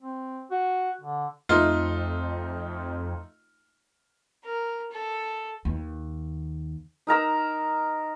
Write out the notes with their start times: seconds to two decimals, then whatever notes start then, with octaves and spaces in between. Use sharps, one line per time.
0.01 C4
0.51 F#4
1.01 D3
1.49 F2 A3 D#4 F4
4.45 A#4
4.92 A4
5.65 D#2
7.07 D#4 A#4 A#5 E6